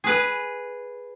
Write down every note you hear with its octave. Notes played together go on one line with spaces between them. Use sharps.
G#4 B4